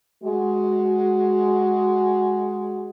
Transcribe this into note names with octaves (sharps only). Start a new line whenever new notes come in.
G#3 F#4